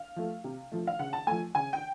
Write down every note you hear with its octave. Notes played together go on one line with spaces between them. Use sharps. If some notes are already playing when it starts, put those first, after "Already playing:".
Already playing: F5
F3 A3
C3
F3 A3
F5
C#3 F#5
A5
F3 A3 G#5
C#3 G#5
G5